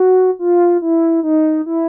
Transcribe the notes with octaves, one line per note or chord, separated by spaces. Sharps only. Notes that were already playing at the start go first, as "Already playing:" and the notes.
Already playing: F#4
F4
E4
D#4
E4